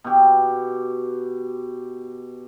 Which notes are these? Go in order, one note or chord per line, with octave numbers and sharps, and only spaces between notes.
B2 G4